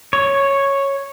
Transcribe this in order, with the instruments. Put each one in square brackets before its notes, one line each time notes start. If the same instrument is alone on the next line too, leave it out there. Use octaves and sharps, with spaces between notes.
[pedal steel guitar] C#5